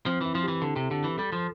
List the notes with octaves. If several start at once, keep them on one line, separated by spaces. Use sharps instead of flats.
F3 C4
E3 E4
F3
E3 G4
D3 A4
C3
D3 G4
E3
G3 A4
F3